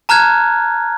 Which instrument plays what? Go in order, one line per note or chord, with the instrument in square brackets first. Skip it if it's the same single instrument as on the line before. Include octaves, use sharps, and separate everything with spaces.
[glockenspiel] A5 A#5 F6 F#6 G#6